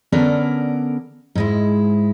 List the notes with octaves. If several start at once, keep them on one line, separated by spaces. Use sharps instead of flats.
D3 B3 C#4 A4 A#4 D5
G#2 G#3 E4